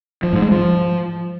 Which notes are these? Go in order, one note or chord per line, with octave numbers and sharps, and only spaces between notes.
F3
G#2
G#3
F3